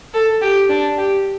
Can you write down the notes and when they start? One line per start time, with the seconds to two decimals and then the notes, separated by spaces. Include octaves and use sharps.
0.14 A4
0.41 G4
0.69 D4
0.98 G4